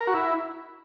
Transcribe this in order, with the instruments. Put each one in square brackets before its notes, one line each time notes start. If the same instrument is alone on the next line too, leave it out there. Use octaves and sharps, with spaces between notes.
[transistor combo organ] A#4
F#4
E4